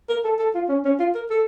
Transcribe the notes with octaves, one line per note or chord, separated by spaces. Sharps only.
A#4
A4
A4
F4
C#4
C#4
F4
A#4
A4